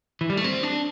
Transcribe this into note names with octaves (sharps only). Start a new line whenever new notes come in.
E3
G3
A3
C4
D4